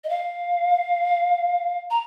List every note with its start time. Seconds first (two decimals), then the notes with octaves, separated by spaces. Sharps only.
0.04 D#5
0.09 F5
1.90 A#5